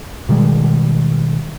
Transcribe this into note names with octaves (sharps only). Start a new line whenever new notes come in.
B2 D#3 G3 G#3